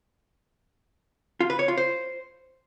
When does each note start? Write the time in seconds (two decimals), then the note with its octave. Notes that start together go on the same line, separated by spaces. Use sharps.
1.40 F4
1.50 B4
1.59 C#5
1.68 F4
1.77 C5